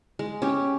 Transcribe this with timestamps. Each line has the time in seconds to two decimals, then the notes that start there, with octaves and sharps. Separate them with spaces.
0.19 G#3
0.42 C#4 G4